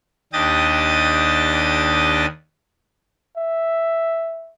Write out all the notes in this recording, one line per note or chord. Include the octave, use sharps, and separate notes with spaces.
D#2 D4 G4 D#5 D#6 A6
E5